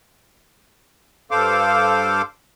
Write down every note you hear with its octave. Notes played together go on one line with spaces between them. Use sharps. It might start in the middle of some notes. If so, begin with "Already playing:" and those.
G2 A4 C5 F5 D6